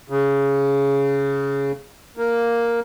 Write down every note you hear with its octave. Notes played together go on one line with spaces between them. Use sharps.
C#3
A#3